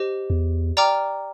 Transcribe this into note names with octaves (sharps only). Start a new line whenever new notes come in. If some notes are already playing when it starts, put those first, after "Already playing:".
Already playing: G4 C5 D#5
E2
D5 G5 A#5 D6 F6